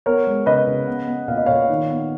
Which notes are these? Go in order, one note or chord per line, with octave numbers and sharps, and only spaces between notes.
B3 A#4 C#5
G#3
C#3 B4 D#5
C#3
B3
B3
A#2 F5
D#5
A#2 C#5 F5
D#3
B3